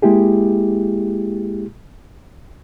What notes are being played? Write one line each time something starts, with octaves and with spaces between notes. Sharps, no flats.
G#3 A#3 E4 G4 G#4